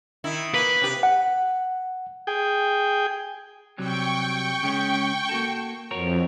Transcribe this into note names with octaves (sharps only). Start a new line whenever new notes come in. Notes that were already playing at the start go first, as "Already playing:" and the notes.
D#3 E4
A#3 B4
C3 G4
F#5
G#4 G5
C3 F#3 G3 G5 C#6
C#3 G#3 C#4
A#3 F#4 A4
F2 F#4 A#4 C#5